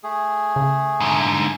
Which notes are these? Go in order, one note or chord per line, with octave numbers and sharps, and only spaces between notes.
A3 G#4
C#3
G#2 D3